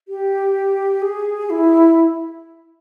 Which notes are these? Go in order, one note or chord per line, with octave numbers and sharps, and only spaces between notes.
G4
G#4
E4